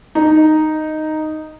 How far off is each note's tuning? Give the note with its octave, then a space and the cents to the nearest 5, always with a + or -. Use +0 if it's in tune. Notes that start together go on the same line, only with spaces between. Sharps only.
D#4 -5